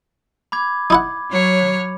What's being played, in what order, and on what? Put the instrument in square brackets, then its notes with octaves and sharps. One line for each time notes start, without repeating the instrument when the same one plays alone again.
[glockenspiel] B5 D6 G#6
[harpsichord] D#4 E4 F#5
[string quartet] F#3 C#5 F6